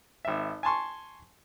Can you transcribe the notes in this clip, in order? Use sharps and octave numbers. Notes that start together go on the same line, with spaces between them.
G#1 E5
G#5 A5 C6 C#6